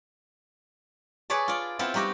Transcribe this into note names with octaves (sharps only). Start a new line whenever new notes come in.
G#4 B4 C#5 D5 A5
F4 D5
B3 C4 E4 F4
G3 D#4 F#4 G4